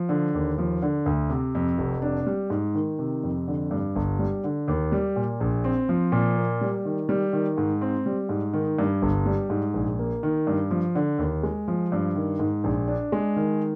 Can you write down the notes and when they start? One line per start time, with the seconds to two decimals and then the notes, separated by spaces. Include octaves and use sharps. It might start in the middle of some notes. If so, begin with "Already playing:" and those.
Already playing: F3
0.09 D3
0.34 D#2
0.58 F3
0.82 D3
1.06 D2
1.30 C3
1.55 F2
1.78 F1
2.02 D4
2.27 G3
2.50 G#2
2.75 D#3
2.99 C3
3.23 F2
3.48 D3
3.71 G2
3.96 G1
4.19 G3
4.44 D3
4.68 D#2
4.92 G3
5.16 A#2
5.40 A#1
5.64 C4
5.89 F3
6.12 A#2
6.37 A#3
6.61 G3
6.85 D#3
7.09 G3
7.33 D#3
7.58 G#2
7.81 C4
8.06 G3
8.29 G#2
8.53 D#3
8.79 G2
9.02 G1
9.26 G3
9.50 G#2
9.74 A#1
9.99 A#3
10.23 D#3
10.47 G2
10.71 F3
10.95 D3
11.19 D#2
11.43 G#3
11.68 F3
11.92 G2
12.16 D#3
12.39 G#2
12.64 A#1
12.88 D4
13.12 G#3
13.36 D#3